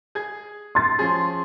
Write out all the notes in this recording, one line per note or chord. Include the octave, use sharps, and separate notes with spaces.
G#4 G#6
C6 A6
F3 C#4 G#4